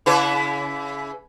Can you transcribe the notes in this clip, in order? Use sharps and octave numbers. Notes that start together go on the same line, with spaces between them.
C#3 E4 B4